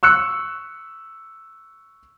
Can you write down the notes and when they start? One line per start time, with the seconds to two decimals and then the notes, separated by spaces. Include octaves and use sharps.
0.03 C#6 E6 F#6 C#7